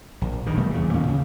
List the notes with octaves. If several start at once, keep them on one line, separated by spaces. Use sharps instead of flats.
A#1
G2 D#3
F1 B2 G3 A3
E2 C#3
D#2 A#2 C#4
C#3